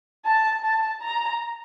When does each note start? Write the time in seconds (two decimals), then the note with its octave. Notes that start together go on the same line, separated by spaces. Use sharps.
0.25 A5
0.64 A5
1.02 A#5